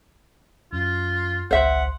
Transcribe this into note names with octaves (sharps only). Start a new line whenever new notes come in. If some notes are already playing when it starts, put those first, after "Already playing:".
F#2 F4
G#1 C#2 C5 E5 F#5 C6